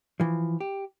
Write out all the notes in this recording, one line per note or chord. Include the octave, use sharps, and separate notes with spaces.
E3 F3
G4